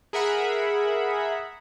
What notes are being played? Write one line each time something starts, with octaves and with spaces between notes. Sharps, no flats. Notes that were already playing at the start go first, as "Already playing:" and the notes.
G#4 A#4 E5 F#5 B5